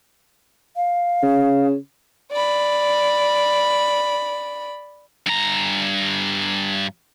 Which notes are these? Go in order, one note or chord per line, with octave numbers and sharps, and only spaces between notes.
F5
C#3
D5 B5
G2 A#5